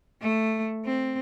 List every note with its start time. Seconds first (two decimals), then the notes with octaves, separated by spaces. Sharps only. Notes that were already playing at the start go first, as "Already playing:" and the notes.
0.22 A3
0.85 C4